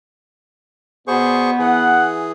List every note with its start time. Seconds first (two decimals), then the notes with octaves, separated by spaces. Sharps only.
1.08 B2 B3 G#4 C5 D5 C#6
1.59 E3 G#4 F#5